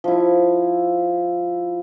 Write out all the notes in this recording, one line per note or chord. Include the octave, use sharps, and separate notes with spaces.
F3 E4